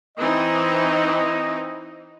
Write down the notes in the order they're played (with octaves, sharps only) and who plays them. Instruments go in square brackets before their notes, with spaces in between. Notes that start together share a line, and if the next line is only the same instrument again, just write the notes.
[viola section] E3 C4 D#4 [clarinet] D#5